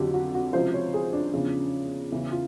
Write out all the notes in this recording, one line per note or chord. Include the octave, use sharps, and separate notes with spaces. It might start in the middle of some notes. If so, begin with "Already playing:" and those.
Already playing: F2 D3 F#3 F4 G4
F#4
F#4
C#2 C3 F3 C5
C#5
G#4
D4
E2 C#3 F3
E2 C#3 E3
F4